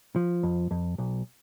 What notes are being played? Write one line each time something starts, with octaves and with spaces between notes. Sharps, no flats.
F3
F2
F2
B1